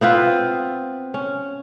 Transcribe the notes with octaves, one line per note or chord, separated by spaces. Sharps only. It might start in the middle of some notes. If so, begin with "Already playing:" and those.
B3 C4 F4 B4
C#4